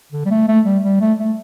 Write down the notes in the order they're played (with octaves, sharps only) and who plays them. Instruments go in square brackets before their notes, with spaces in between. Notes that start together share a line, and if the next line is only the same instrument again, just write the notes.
[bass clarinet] D3
G3
A3
A3
G3
G3
A3
A3